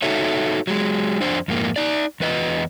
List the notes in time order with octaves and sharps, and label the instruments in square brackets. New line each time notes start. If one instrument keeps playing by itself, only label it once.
[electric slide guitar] D#4 F#4 A4 C#5 E5
F#3 G#3
F2 D4 C5
F2 G#2 A#3
D#4 D5
E2 B4 D#5